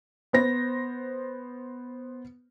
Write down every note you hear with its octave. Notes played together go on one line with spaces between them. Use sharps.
B3 C5 A#6